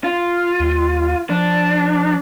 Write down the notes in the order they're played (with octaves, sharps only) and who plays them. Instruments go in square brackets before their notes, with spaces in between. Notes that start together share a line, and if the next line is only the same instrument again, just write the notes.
[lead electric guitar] F4
[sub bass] D#2
[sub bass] F3 [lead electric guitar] D4